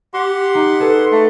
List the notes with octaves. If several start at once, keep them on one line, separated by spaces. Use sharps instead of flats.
G4 F#5 C6
D#4
G#4 A4 B4
A3